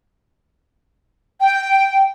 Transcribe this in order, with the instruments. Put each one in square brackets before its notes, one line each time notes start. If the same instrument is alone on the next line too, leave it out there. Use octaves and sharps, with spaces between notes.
[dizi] G5